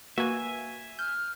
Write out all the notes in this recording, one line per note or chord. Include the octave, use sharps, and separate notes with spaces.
A#3 F#4 B4 E5 G#5
F6 G6